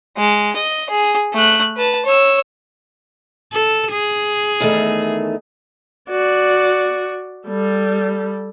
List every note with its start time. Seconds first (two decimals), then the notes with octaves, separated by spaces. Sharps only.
0.17 G#3
0.56 D#5
0.90 G#4
1.34 A3 F#6
1.77 B4 A5
2.05 C#5 E6
3.53 A4
3.92 G#4
4.60 E2 D#3 A3
6.10 F#4 D5
7.47 G3 A4